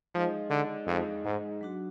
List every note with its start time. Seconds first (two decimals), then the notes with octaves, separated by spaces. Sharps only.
0.14 F3 G#3 D#4 G#4 D#5
0.50 D3
0.87 F2 G#3 D#4 G#4 D#5
1.25 G#2
1.61 F#3 D4 F#4